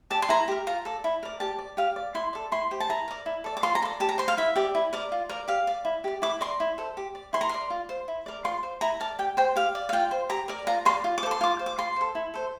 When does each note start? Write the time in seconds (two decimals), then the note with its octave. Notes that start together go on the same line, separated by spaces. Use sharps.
0.10 G4 D5 A5
0.22 C6
0.29 E4 A#5
0.48 G4 A#4
0.67 F4 A#5
0.85 A4 D5
1.04 E4
1.23 A#4 D5
1.40 G4 A5
1.59 D5
1.77 G4 F5
1.96 D5
2.15 E4 C6
2.33 A4 D5
2.52 E4 C6
2.71 G4 C5
2.80 A5
2.89 E4 A#5
3.08 A#4 D5
3.26 E4
3.44 A4 D5
3.57 D6
3.63 F4 C6
3.75 A#5
3.82 A4 C6
3.85 D5
4.00 G4 A5
4.09 A#5
4.18 C5 C6
4.28 F5
4.37 E4 E5
4.56 G4 D5
4.75 E4
4.93 A#4 D5
5.12 F4
5.29 A#4 D5
5.48 G4 F5
5.67 D5
5.85 E4
6.04 G4 D5
6.22 E4 D6
6.41 A#4 D5 C6
6.60 E4
6.78 A4 C5
6.97 G4
7.15 D5
7.33 E4 C6
7.41 A#5
7.49 A#4 D5 C6
7.70 F4
7.89 C5
8.08 E4
8.26 A#4 D5
8.44 F4 C6
8.63 C5
8.81 E4 A#5
9.00 A#4 D5 A5
9.19 G4 G5
9.37 C5 G5
9.56 G4 F5
9.75 D5
9.89 F5
9.93 F4 G5
10.11 C5
10.30 G4 A#5
10.48 A#4 D5
10.67 F4 A#5
10.85 A#4 C6
10.89 D5
11.04 F4
11.18 D6
11.23 C5
11.26 A4 C6
11.41 F4 D6
11.59 C5
11.66 D6
11.78 F4 C6
11.96 A4 C5
12.15 E4
12.34 A4 C5